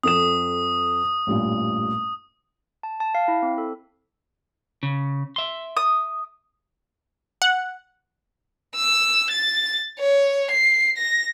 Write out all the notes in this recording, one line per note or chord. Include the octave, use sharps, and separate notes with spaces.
F2 A4 D#6 E7
A1 G2 A#2
A5
A5
F5
E4
C4
A4
C#3
E5 C6
D#6
F#5
E6
A6
C#5
C7
A#6